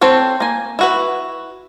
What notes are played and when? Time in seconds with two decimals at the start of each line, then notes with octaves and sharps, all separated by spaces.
0.01 C4 A4 C5 C#5
0.40 A#3 G#5
0.79 E4 F#4 B4